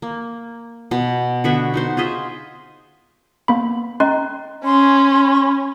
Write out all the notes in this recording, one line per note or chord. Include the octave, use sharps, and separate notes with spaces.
A#3
B2
D3 B3 F#4 E5
D#4 F#4 C5
F4 G#4 D#5 E5
A#3 B3 B5
C#4 D#5 A#5 C6
C#4 C6